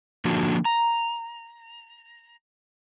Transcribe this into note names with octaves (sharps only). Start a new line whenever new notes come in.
D3 F3 A#3 D4 F#4
A#5